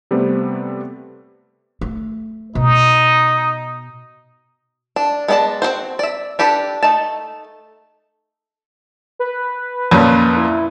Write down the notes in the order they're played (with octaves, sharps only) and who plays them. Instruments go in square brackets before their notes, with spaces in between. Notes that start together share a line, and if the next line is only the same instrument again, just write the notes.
[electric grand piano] C3 G3 A3 B3 C4
[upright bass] A3
[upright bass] B2 [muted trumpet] D#4
[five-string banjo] D4
G#3 B3 D#4 D5 A5
C4 E4 F#4 C5
D5 E5
D4 G4 A4 B4
A3 D#4 A5
[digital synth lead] B4
[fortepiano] F2 A#2 C#4
[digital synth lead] E4